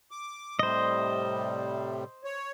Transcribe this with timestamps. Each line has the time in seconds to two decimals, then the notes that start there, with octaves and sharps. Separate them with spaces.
0.11 D6
0.59 A2 C3 G3 C5 D#5
2.24 C#5